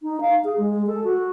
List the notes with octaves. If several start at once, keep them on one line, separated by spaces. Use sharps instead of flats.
D#4
F5
G#4
G#3
A4
F#4